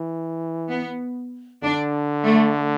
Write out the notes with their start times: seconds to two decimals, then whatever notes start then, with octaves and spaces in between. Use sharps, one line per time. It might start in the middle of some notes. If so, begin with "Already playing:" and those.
Already playing: E3
0.70 B3
1.63 D3 D4
2.25 A3